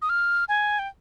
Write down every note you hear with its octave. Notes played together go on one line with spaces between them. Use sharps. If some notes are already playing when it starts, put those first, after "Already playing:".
D#6
F6
G#5
G5